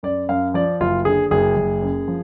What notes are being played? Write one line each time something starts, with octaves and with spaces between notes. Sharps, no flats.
F#2 D5
F#2 F5
F3 D5
F#1 F4
D3 G#4
F#1 G#4
F#1
F#2
F3